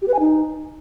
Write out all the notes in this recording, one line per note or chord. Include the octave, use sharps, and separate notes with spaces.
G4
B4
G#5
D#4